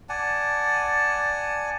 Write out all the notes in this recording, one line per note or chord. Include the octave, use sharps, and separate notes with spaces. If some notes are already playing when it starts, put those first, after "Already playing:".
D5 F#5 G#5 A5